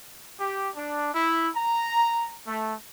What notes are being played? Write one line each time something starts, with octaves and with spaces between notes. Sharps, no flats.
G4
D4
E4
A#5
A3